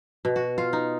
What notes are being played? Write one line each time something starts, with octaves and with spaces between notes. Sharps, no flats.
B2
F#4
F4
D#4